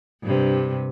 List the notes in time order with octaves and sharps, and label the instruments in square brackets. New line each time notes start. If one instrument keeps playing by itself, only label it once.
[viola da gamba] G2 C3